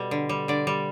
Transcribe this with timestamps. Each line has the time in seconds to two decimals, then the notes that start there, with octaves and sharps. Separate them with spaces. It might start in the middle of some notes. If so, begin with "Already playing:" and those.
Already playing: B2 G3 A4
0.11 D3
0.29 G3
0.48 D3 D5
0.67 G3